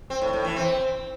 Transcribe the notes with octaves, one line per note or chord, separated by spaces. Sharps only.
C4
A2
A2
E3
C4